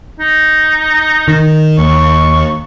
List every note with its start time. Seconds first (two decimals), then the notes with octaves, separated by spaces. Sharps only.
0.20 D#4
1.28 D#3
1.78 D#2 C#6